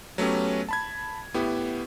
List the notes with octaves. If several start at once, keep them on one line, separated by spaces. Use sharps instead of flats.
F#3 A3 B3 C#4 G4
A5 B5 G#6
A2 B3 E4 G4